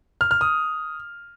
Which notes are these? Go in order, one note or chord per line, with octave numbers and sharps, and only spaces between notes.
F6
F6
D#6